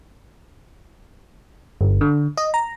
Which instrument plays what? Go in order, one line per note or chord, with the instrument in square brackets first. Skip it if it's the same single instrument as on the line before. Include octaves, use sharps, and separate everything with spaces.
[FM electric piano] G1
D3
D#5
A#5